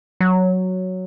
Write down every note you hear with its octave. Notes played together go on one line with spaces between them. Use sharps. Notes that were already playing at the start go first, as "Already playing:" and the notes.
F#3